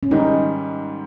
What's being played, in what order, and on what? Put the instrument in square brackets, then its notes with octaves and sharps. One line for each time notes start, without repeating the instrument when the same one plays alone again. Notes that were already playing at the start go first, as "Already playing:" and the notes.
[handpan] C#4
[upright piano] G#2 D#3 G3 [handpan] D#4